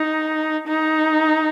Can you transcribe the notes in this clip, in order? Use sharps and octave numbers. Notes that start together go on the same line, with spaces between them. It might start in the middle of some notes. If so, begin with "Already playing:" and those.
Already playing: D#4
D#4